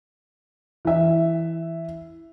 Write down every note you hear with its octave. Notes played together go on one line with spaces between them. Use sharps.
E3 E5